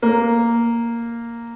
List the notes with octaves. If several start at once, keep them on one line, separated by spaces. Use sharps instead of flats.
A#3